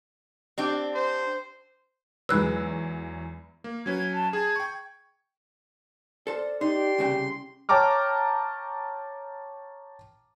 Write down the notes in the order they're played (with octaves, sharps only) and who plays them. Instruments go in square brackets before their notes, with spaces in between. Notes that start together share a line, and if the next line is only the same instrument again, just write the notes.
[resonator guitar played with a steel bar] C4 D4 G4
[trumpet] C5
[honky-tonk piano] E2 F#3 [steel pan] G#3 B4 [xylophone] E6 F#6
[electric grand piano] A#3
[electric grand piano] F#3 C#4 B4 [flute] G#6
[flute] A5
[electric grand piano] G#4 A5 [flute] G#6
[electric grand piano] G5 C#6
[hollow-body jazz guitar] A4 C5 [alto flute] D5
[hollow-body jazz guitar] D#4 [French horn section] G4 [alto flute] D5 [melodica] C6
[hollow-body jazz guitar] C2 C#3 G5
[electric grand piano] C#5 G5 A5 A#5 D6 F6